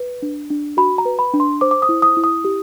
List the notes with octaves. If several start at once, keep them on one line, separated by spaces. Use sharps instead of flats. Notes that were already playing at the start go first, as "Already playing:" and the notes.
Already playing: B4
D4
D4
F#4 B5
A#5
B4
B5
D4
C6
C5 D6
D6
D#6
E4
D#6
E4
D#6
G4